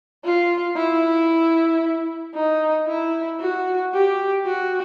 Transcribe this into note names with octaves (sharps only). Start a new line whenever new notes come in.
F4
E4
D#4
E4
F#4
G4
F#4